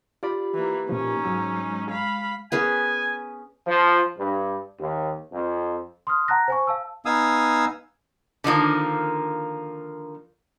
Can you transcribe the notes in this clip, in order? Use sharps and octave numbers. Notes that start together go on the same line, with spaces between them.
F4 G4 D5 B5
E3 A#3
A#2 F3 C#4 D#4
G#2 F#3 E6
G#3
F5 B5
B3 C#4 G#4 G#5
F3
G2
D#2
F2
C6 D#6 F6
F#5 A5 A#5 F#6 A#6
C5 G#5 C#6
F5 A5 E6
B3 D#4 F5 G#5 D#6 E6
D3 D#3 F3 A#3